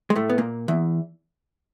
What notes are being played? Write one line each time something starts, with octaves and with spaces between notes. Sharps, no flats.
G#3
A2 A3
B3
A#2 A#3
E2 E3